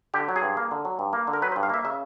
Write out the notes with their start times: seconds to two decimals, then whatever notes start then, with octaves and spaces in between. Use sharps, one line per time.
0.14 D3 G4
0.29 F#3
0.36 G#4
0.42 G2
0.57 A#3
0.71 D3
0.85 F#3
0.99 G2
1.13 A#3
1.27 D3
1.33 A#4
1.42 F#3 B4
1.52 C5
1.56 G2
1.63 F5
1.70 A#3 E5
1.85 C#3 E5